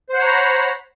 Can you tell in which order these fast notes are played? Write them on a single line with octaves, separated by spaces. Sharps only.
C5 F#5 C#5 A#5 B5